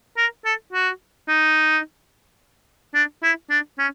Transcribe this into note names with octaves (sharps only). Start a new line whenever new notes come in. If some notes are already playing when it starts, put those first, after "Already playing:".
A#4
A4
F#4
D#4
D4
E4
D4
C#4